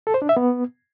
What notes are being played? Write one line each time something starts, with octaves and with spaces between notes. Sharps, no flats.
A4
C5
D4
E5
B3